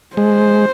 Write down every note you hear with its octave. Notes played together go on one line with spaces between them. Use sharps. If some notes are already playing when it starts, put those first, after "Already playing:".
G#3 C5